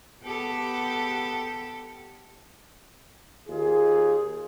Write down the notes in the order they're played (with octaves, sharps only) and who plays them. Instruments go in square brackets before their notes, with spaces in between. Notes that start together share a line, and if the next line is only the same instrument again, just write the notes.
[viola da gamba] B3 G4 A4
[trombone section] D#2 F4 G#4